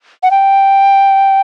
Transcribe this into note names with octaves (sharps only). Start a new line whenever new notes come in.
F#5
G5